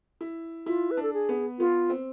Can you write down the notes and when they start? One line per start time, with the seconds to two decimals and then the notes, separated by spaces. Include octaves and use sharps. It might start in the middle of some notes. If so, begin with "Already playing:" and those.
0.21 E4
0.66 E4 F4
0.91 B4
0.97 D4
1.02 A4
1.13 G#4
1.29 B3
1.59 B3 F4
1.90 C4